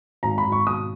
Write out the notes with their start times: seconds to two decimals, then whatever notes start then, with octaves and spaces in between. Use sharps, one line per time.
0.23 G#1 A#5
0.38 B5
0.45 G#1
0.52 C#6
0.67 B2 D#6